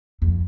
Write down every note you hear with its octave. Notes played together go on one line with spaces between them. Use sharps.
F2